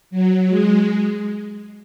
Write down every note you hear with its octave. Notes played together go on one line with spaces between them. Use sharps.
F#3
G#3